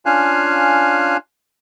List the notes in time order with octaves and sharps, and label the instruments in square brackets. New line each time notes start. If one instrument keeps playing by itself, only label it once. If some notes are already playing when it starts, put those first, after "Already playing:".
[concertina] C#4 D4 F4 F5 G#5 F#6